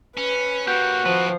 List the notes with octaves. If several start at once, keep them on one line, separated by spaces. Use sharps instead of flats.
C#4 B4
A#3 C#4 F#4 G4
D#3 F3 C4 B4